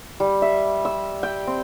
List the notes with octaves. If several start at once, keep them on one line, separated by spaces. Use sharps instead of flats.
G3
E5
E6
G5
C4